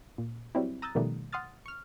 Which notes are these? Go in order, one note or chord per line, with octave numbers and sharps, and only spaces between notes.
A#2
F#3 G3 C4 E4
A#5 D#6 E6 F#6 G6 A6
B2 D#3 F3 G3 A3
F#5 C6 D#6 F6 A6
C#6 F6